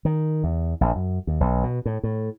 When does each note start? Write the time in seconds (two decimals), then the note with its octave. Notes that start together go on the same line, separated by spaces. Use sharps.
0.05 D#3
0.44 E2
0.81 A#1
0.96 F#2
1.27 D#2
1.40 B1
1.63 B2
1.86 A2
2.03 A2